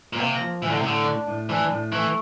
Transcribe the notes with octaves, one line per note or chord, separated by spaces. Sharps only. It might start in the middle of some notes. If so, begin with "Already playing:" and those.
A#2
C3 A#3
F3
A2 E3
D3
C3
A2 D3
D4
A2
E3 D4
A2
E3 A3